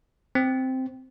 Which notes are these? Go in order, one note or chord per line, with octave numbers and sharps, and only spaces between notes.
C4